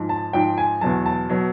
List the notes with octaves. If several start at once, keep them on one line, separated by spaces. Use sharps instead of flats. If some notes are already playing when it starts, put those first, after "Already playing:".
Already playing: G#2 F3
A5
G#2 F3 G5
G#5
E2 B2 F#3 A5
A5
B2 F#3